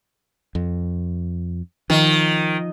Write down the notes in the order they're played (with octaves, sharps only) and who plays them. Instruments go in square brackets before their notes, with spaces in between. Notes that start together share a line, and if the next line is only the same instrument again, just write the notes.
[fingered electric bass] F2
[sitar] D#3 [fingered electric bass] F3